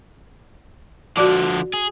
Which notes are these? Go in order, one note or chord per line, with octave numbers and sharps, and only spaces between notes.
D3 F3 F#4 D5 D6
G#4